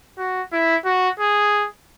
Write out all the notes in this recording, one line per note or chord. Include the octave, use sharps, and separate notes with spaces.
F#4
E4
F#4
G#4